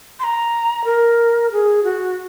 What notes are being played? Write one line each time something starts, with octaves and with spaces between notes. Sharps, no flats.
C6
A#5
A#4
G#4
F#4